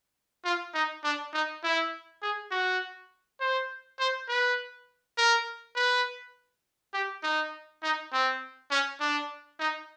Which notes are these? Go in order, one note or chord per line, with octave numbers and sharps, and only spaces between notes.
F4
D#4
D4
D#4
E4
G#4
F#4
C5
C5
B4
A#4
B4
G4
D#4
D#4
C4
C#4
D4
D#4